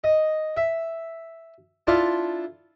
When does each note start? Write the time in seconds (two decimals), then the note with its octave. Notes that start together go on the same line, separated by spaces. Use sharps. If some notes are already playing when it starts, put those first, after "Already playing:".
0.04 D#5
0.57 E5
1.87 D4 E4 F4 A4 F5 C6